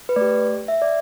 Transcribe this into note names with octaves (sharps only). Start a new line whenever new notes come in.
B4
A3 G4 D5
E5
D5